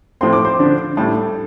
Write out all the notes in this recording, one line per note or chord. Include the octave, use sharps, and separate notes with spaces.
A2 F3 C4 C6
D6
C5 C6
D3 F3 D4
A2 G3 D4 A4 A5